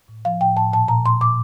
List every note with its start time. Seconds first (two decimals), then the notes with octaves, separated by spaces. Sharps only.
0.08 A2
0.25 F3 F5
0.41 A2 G5
0.57 A2 A5
0.72 A#2 A5
0.88 A#2 A#5
1.06 A#2 C6
1.21 A#2 D6